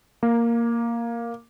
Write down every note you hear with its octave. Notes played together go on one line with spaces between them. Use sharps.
A#3